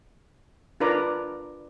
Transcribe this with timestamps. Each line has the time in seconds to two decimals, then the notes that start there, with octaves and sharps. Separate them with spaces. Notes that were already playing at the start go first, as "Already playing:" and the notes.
0.80 D4 F4 A#4 B4 D5 A#5